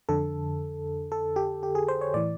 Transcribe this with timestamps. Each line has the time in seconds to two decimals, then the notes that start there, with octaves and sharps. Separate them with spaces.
0.09 F2 D3 A4
1.12 A4
1.36 G4
1.63 G4
1.75 G#4
1.88 C5
2.01 C#5
2.14 A2 E3 D5